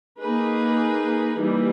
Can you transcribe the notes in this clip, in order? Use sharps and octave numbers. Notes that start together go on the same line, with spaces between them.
A#3 D#4 G#4 B4
E3 G3 A#3 D#4